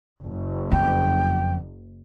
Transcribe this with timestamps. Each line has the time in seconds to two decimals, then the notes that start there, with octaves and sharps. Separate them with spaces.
0.23 F#1
0.72 F2 C#4 G5